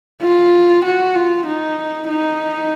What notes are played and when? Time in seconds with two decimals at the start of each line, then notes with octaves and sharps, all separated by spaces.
0.22 F4
0.84 F#4
1.15 F4
1.46 D#4
2.08 D#4